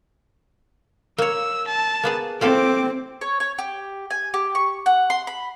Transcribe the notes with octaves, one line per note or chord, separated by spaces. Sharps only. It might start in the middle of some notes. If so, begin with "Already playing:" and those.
A#3 C#5 E6
A5
A#3 B3 G#4
A3 C4 F4 A4 D6
C#5
C#5
G4
G#5
G4
C#6
F#5
C6
B5